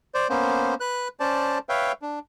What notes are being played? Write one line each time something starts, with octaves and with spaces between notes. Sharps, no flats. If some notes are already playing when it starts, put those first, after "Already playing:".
C5 D5
A#3 B3 C#4 C5
B4 F#6
C#4 C5 D5 A5
B4 C#5 E5 F5 G5
D4